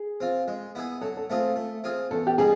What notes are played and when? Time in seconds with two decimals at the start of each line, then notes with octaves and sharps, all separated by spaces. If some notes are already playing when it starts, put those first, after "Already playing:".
Already playing: G#4
0.21 C4 F4
0.48 G#3
0.75 B3 E4 G#4
1.01 F#3 A4
1.17 A4
1.30 A3 C4 F4 G#4
1.56 A3
1.84 C4 F4 G#4
2.11 E2 A4
2.27 G4
2.38 B2 G3 B3 G#4